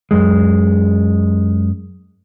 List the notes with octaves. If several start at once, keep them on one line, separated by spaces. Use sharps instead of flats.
F#2 G#3